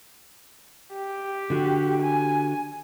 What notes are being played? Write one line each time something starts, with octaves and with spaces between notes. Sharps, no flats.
G4
D3 F#4
G#5